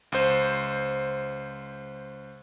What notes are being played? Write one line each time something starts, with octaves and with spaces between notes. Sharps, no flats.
C#2 C5